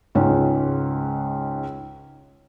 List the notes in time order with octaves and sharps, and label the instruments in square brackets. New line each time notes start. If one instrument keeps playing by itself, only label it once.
[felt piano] C#2 G#2 C#4